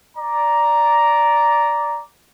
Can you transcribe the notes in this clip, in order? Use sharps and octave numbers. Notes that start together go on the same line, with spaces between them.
D5 A#5